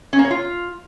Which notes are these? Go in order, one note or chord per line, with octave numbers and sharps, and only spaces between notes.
C#4
A#3
C#5
F4